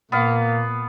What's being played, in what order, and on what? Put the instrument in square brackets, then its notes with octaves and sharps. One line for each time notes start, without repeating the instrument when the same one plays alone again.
[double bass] A#2 [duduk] A#3 [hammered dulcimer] B3 F5